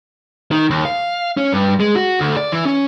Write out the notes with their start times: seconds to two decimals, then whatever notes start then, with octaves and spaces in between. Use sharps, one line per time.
0.51 D#3
0.70 D#2
0.85 F5
1.37 C#4
1.53 G2
1.80 G#3
1.96 F#4
2.20 D2
2.37 D5
2.52 E3
2.65 C#4